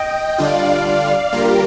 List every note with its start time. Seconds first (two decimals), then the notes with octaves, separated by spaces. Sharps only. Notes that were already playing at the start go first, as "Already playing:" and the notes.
Already playing: D#5 G5
0.38 D3 G3 D4 F4 D5 F5
1.32 D3 G3 A#3 F4 G4 A#4